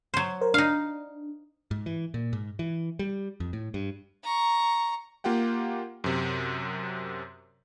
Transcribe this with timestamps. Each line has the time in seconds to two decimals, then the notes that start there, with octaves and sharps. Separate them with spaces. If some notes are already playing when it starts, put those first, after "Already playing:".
0.14 F#3 C5
0.41 A#4 C5
0.54 D4 D#4 F5
1.71 G#2
1.86 E3
2.14 A#2
2.33 G#2
2.59 E3
2.99 G3
3.40 F2
3.53 A2
3.74 G2
4.23 A#5 C#6
5.24 A#3 F4 G4 F#5 G5
6.04 F#2 C3